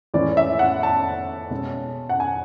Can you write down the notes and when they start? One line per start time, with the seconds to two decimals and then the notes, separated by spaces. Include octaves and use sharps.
0.14 A2 E3 G#3 C#4 D5
0.37 E5
0.59 F#5
0.83 A5
1.50 B2 G#3 C#4
2.09 F#5
2.20 G#5